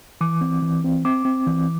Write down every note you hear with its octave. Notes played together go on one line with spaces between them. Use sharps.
E3 D6
C4
E3
C4
C4 D6
C4
E3